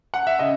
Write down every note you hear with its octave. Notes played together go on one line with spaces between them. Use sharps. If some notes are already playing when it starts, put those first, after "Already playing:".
F#5
E5
C#3 D#5